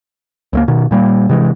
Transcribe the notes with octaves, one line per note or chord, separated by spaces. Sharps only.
C#2 A3 A#3
B2 D#3
A#2 G3 A#3
C3 E3 G#3